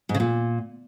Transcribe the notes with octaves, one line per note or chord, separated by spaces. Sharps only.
G#2
C#3
A#2